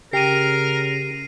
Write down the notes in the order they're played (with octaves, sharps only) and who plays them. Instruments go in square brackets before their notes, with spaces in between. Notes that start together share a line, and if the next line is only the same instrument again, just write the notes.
[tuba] C#3 [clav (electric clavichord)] G4 [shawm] A#4 [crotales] C7 D#7